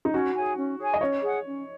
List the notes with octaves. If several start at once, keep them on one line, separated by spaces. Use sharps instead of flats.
D#4
C#4 F#4
G#4 C#5 G#5
C#4
G#4 C#5 G#5
D#5
C#4 C#5
G#4 F#5
C#4